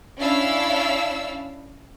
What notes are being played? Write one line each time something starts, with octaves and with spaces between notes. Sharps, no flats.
C#4 D4 E4 F5 E6